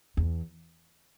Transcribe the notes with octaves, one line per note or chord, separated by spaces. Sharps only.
E2